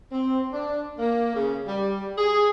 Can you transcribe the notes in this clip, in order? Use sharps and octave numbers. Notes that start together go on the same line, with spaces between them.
C4
D4
A#3
C#3
G3
G#4